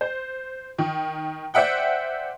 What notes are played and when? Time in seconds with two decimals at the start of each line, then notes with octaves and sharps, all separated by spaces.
0.01 C5
0.78 D#3
1.54 C5 D5 E5 F#5 G5